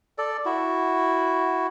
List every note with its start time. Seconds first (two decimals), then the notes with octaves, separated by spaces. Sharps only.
0.18 A4 D5
0.45 E4 F#4